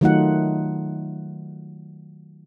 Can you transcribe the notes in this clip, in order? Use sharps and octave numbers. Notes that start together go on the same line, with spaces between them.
D#3 F#3 A3 D#4 F4 F#5